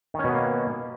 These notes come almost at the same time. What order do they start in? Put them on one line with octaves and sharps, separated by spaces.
D#3 C#4 B2 B3 A#3